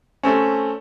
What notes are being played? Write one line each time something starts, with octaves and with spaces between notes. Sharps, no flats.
A3 C4 C#4